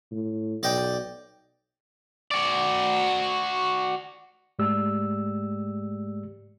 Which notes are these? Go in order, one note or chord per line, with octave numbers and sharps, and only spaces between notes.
A2
B1 D5 D#5 G5
F#4 D5
G#2 G#3 A3 G4 D5 E6